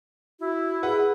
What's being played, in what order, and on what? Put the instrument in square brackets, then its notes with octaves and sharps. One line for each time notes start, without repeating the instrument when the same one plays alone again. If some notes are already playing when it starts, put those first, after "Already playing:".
[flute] E4 [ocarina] F#4
[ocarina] G#4 [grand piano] B4 F#5